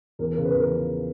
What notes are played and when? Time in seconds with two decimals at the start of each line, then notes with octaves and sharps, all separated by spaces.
0.19 E2 A#4
0.32 A#4
0.37 C#3
0.45 B4
0.54 E2 A#4
0.71 F3